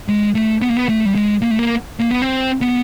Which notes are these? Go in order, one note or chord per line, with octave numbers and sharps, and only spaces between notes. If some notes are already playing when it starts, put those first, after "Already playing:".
G#3
A3
B3
A#3
B3
A3
G3
G#3
A#3
A3
A#3
A#3
B3
C4
B3